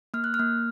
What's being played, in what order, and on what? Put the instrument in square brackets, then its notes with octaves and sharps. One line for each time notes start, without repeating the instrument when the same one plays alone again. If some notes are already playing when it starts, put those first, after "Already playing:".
[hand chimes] A#3 F6
F#6
F6
A#3